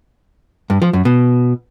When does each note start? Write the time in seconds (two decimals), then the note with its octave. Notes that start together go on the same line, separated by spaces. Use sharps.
0.70 G2
0.82 F3
0.93 F#2
1.05 B2